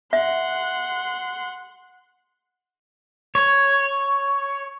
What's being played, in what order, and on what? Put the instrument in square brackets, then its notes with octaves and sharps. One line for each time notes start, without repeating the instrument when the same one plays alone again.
[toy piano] E5 [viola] F#5 C6
[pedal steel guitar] C#5